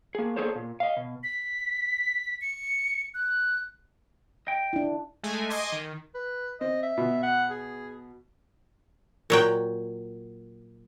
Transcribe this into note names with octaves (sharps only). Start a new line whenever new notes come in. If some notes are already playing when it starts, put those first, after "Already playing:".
A#3 G#4
A#3 D4 G#4 A4 C5 C#5
A#2
D#5 F5
B2
B6
C#7
F#6
D#5 G5
D4 E4
G#3 A3 G#5
D#5 G#5 C6 D6
D#3
B4
C4 D#5
E5
B2
F#5
G#4
A#2 F#3 G5